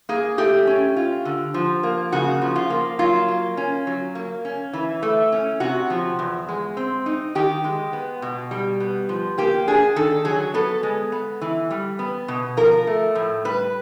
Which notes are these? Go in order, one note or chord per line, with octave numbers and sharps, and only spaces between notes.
A#3 G#4
A3 G4
C#4
F4
D3
F3
A#3
C#3 F#4
F3
F4
A#3
F#3 F4
A#3
C#4
F#3
A#3
C#4
E3
A3
C#4
C3 F#4
F3
E2
G#3
C4
D#4
D#3 G4
G#3
B3
B2
G3
B3
F3
A#3 G4
D4 G#4
D#3 A4
F#3 G#4
B3 A4
G#3
B3
E3
G3
B3
B2
F3 A#4
A3
A2
G3 B4